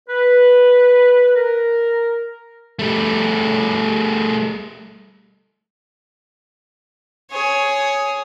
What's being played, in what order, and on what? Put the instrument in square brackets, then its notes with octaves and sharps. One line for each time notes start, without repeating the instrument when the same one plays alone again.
[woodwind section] B4
A#4
[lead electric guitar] G3 A3
[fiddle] G#4 C#5